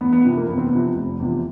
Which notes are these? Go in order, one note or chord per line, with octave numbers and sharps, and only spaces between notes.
E2 B3
B3
C3 F3
A#3
E2 B3
C4
B3
C3 F3
F1
E2 C3 F3